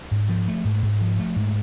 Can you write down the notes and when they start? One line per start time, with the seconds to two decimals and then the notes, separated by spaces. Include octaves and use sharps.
0.11 G#2
0.29 F3
0.48 A3
0.65 G#2
0.82 G#2
1.01 F3
1.19 A3
1.36 G#2